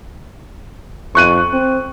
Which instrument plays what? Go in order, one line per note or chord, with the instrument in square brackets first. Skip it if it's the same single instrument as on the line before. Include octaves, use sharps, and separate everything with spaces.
[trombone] F2 [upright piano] C#6 F#6 D#7
[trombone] C4